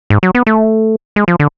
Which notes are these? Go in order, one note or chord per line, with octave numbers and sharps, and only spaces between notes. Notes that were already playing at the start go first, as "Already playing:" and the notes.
G#2
F#3
B3
A3
G#3
F3
D3